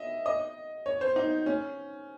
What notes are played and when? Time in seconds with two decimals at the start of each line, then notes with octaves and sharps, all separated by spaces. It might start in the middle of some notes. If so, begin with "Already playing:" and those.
Already playing: D#5 E5
0.26 D#5
0.86 C#5
1.01 C5
1.16 D#4
1.46 C#4